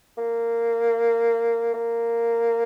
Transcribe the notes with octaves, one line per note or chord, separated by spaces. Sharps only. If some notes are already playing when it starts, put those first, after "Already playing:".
A#3
A#3